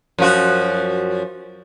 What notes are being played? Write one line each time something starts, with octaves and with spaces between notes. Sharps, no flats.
F#2 F3 F#4